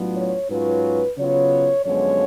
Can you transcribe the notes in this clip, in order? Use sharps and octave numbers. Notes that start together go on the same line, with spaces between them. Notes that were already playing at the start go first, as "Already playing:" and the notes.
Already playing: A2 F#3 B3 D4 F4
C#5
G#2 F#3 C#4 F4 B4
C#3 F#3 B3 F4 C#5
F#2 D3 F3 G#3 B3 C#5